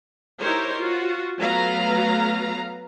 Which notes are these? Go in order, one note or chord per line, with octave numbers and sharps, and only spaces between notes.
D#4 E4 G4 A#4 C5 C#5
F4 F#4
F#3 A3 B3 B4 F5 A#5